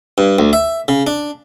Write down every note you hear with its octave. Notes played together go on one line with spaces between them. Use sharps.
G2
D2
E5
C#3
D4